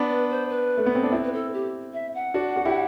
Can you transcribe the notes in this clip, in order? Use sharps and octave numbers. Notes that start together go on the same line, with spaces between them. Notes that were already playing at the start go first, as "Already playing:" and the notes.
Already playing: B3 D4
B4
C5
B4
A3
B3
C4
D4
C4 E4
B4
A4
G4
E5
F#5
D4 F#4
F#4
E4 G4